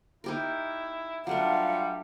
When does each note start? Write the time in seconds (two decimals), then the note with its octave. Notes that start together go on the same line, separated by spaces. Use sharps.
0.24 D#4 E4 G4 A#4
1.27 F#3 G3 A3 D4 F4 F5 F#5